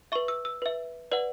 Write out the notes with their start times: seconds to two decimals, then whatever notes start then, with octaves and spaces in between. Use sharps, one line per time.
0.12 B4 E5 C#6
0.28 E6
0.45 E6
0.62 B4 E5
1.12 B4 D5 F#5